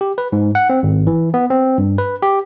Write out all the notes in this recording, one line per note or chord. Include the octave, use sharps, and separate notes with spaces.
G4
B4
G#2
F#5
C4
G#1
E3
B3
C4
G2
B4
G4